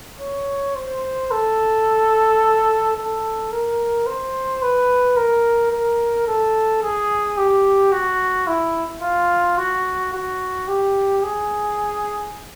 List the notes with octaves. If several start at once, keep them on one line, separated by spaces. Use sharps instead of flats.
C#5
C5
A4
A4
A#4
C5
B4
A#4
A#4
A4
G#4
G4
F#4
E4
F4
F#4
F#4
G4
G#4